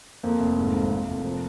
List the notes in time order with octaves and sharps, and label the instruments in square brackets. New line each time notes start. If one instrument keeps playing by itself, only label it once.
[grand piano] F2 [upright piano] A#3
[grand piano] F1
G#2
G#1
F2
F1
F3